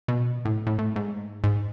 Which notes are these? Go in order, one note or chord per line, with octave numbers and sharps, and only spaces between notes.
B2
A2
A2
A2
G#2
G#2